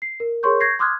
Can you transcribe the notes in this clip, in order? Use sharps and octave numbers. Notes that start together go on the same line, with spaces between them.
C7
A#4
G#4 A#4 C#5 C6 C#6 G6
C#6 G6 G#6 A#6 C7
C6 D6 D#6 F6 F#6 G#6